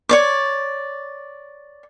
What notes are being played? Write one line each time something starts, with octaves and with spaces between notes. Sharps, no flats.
C#5 D5 D6